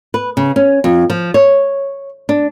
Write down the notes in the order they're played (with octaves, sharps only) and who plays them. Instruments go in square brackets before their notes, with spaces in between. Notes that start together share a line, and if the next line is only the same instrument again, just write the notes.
[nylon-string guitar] B4
C#3
C#4
F2
F3
C#5
D4